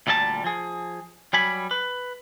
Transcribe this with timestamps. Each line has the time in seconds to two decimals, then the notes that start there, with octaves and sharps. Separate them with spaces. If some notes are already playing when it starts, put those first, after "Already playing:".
0.07 D2 A#2 G3 A4 A5
0.44 F3 G#4
1.33 F#3 G3 G#5 B5
1.71 B4